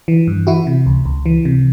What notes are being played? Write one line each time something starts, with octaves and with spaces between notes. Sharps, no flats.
E3
G2
E3 E4 F#4
C3
C#2
C#2
E3
C3